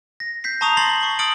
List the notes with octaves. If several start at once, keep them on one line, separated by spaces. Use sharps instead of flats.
A#6
G6 B6 C7
A5 A#5 C#6 D#6 D#7 F7
C6 D#6 A6 A#6 C7 F#7
C#6 B6
D#6 F6 A6 C#7 D7 F#7